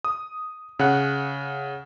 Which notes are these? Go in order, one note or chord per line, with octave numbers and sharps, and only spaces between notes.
D#6
C#3 F#5 F#6